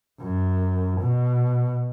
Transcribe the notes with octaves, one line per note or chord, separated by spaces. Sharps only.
F#2
B2